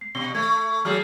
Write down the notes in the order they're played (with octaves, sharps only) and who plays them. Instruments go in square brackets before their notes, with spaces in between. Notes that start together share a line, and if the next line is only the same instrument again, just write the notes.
[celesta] C7
[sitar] B2 [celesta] G7
[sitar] A3 [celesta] G#6
[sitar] F#3 A3 G#4 [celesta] F6